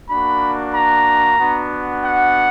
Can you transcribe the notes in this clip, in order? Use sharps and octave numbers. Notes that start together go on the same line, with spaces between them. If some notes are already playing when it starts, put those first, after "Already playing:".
A#3 D4 F#4 B5
A#5
B3 D4 F#4
F#5